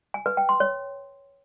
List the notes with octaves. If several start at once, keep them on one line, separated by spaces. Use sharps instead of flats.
G#5
B4
G5
C6
C#5